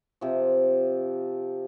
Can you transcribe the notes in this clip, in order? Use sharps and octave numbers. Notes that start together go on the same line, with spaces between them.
C3 F3